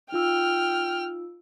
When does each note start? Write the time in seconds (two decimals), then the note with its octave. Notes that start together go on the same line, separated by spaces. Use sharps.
0.12 D#4 F4 G5 E6 F6